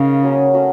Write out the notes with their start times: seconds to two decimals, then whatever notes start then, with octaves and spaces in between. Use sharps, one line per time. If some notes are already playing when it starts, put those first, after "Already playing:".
Already playing: C#3 D#4 A#4 F5
0.23 F#3 A#3 C#4
0.54 F#3 A3 C#4